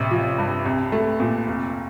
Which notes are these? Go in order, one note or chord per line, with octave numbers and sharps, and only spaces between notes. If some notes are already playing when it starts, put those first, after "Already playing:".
Already playing: A1 C3
F3
G2
C2
A3
A#2
F1